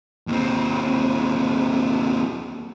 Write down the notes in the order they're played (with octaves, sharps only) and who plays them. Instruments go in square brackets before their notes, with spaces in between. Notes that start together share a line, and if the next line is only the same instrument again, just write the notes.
[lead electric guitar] D#2 C4